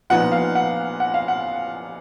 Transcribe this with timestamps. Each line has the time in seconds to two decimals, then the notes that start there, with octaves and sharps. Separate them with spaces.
0.10 A#2 F3 B3 D#4 F#5
0.32 F5
0.55 F#5
1.00 F#5
1.14 F5
1.28 F#5